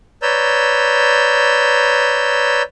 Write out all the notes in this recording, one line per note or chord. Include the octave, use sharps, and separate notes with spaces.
B4 C#5 D5 A#5 E6 G6